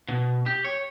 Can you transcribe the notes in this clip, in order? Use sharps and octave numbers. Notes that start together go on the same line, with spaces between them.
B2
G4
C#5